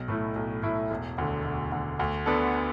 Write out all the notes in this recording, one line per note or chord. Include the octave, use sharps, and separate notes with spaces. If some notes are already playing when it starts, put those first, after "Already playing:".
Already playing: B1
A2 A3 E4
B1
A2 A3 E4
E1
D2 D3
E1
D2 D3
D2
D3 B3 D4 A4